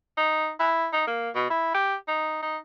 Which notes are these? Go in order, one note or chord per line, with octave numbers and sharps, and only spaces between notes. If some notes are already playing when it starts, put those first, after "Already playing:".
D#4
E4
D#4
A#3
B2
E4
G4
D#4
D#4